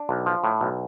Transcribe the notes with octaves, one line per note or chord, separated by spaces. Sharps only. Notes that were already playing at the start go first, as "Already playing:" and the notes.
Already playing: D4
B1
F3
A2
B1